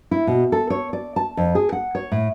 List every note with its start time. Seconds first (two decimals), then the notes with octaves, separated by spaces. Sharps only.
0.11 E4
0.27 B2
0.52 A4
0.70 C#5
0.93 D5
1.16 A5
1.37 F2
1.55 G#4
1.72 F#5
1.95 C#5
2.12 A2